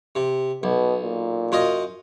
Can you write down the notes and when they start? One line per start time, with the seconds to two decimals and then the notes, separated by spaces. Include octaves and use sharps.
0.15 C3
0.63 B1 B2
1.03 A#2
1.52 F#2 F4 D#5